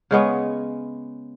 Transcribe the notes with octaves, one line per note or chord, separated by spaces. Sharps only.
C#3 G#3 B3 C#4